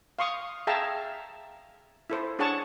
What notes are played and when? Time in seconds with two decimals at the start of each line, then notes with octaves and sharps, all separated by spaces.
0.19 F5 C6 C#6 D#6
0.67 G#4 E5 F5 G5 A5 A#5
2.10 E4 A4 C5
2.39 D4 G#4 C#5 F#5 A5 C#6